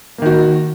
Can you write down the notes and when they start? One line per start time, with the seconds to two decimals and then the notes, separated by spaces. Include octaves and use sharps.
0.18 A#3
0.22 D#3
0.26 F#4